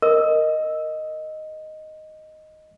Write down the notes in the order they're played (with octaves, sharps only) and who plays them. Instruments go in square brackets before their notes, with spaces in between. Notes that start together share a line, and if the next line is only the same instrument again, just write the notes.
[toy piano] A#4 [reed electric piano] D#5